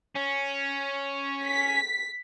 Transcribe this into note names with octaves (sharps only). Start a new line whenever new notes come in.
C#4
B6